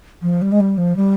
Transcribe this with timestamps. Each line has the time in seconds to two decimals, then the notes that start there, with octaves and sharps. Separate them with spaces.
0.22 F3
0.42 G3
0.52 G#3
0.60 G3
0.78 F3
0.96 G3